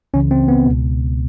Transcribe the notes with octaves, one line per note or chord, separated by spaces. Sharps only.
C#2 C#3 E3 C#4
C4
B3
C#2 B2